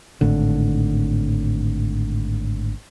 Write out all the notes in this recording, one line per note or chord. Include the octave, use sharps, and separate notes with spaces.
G#1 A2 D3